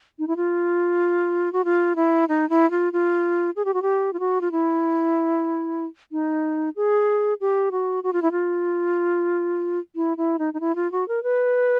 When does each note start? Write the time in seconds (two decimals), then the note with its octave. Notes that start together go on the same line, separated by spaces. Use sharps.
0.19 D#4
0.28 E4
0.37 F4
1.53 F#4
1.65 F4
1.96 E4
2.29 D#4
2.50 E4
2.71 F4
2.93 F4
3.56 G#4
3.65 G4
3.74 F#4
3.82 G4
4.13 F4
4.20 F#4
4.41 F4
4.52 E4
6.12 D#4
6.76 G#4
7.41 G4
7.72 F#4
8.04 F#4
8.13 F4
8.22 E4
8.32 F4
9.96 E4
10.17 E4
10.39 D#4
10.54 D#4
10.60 E4
10.76 F4
10.92 F#4
11.08 A#4
11.23 B4